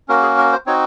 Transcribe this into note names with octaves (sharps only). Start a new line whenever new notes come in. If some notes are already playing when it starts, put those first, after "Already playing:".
A#3 C#4 F#4 A#4
G#4
A#4
C5
C4 D#4 F#4 C#5